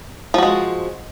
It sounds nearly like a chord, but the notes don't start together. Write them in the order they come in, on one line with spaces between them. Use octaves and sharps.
F3 F#4 G#3